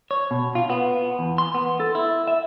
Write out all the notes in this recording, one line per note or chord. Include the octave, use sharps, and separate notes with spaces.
C#5
B2
F4
B3
E2
C6
B3
A4
E4
E5